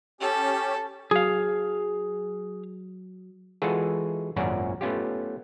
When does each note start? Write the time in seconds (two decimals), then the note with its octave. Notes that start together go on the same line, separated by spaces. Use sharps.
0.21 C#4 G4 A4
1.11 F#3 G#4 F5
3.62 E3 G#3 F4 F#4 G#4 A4
4.36 G#1 F#2 A#2 C#4 F#4 D5
4.81 A3 B3 C#4 F4 G4